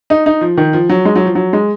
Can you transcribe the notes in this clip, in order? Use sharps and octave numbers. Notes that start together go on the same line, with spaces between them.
D#4
D#4
F3
D#3
F3
F#3
G#3
F#3
F3
F#3
G#3